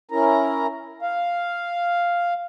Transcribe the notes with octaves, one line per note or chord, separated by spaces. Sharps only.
C#4 E4 A#4 A#5
F5